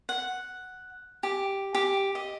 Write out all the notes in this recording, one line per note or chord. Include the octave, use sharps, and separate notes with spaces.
F#5
G4
G4
D#5